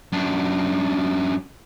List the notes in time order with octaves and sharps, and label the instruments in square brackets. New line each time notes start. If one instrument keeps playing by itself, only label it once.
[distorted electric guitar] F#2 D4